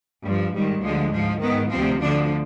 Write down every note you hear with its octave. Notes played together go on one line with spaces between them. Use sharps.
G2 G3
F3
G#2 D#3 G3
D2 D3 F3 G#3
G#2 F3
G#2 D#3 B3
D2 C3 F3 C4
D2 D3 F3 D4